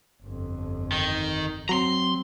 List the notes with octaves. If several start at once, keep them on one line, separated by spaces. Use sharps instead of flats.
G1 F2
D#3
F#3 C4 A#5 C6